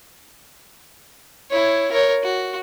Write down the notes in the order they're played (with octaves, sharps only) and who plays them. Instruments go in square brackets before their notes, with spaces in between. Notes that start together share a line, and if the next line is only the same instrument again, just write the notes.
[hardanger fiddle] E4 C#5
A#4 C#5
F#4